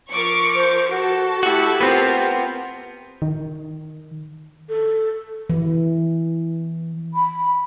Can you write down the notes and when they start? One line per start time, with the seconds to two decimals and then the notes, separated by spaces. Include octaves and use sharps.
0.11 F3 A#4 C#6 D6
0.55 C5
0.90 F#4 A4
1.43 A3 E4 F#4 G4
1.81 B3 C4 F4 A#4
3.22 D#3
4.69 A4
5.50 E3
7.14 B5